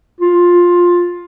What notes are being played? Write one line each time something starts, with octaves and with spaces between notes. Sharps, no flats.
F4